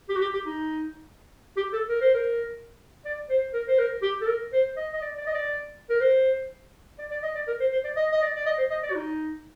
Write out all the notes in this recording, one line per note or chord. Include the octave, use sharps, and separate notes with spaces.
G4
F#4
G4
G4
D#4
G4
A4
A#4
C5
A#4
D5
C5
A#4
C5
A#4
G4
A4
A#4
C5
D#5
D#5
D5
D5
D#5
D5
A#4
C5
D5
D5
D#5
D5
A#4
C5
C5
D5
D#5
D#5
D5
D5
D#5
C5
D#5
D5
F#4
D#4